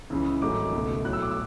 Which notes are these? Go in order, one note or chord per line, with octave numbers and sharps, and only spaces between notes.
C#2 C#3 E3
G#1 G#2 F#3 A3 D6
C#2 B2 A3
B1 A2 F#3 A3 F#6
E6
D6
E6